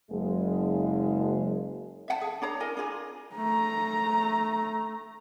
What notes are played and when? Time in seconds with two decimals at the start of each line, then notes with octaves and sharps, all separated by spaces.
0.11 F#1 G#3
2.08 E5 F#5 A5
2.21 G#4
2.42 D4 C#5 A#5
2.60 E4 A#4 D#5 G#5
2.77 D4 F4 G#4 A#5
3.36 A3 A#5